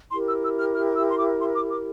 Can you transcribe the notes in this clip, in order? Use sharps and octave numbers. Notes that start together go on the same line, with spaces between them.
E4 G4 A#4 C6
E6
E6
F6
F6
E6
C6
D6
C6
D6
D6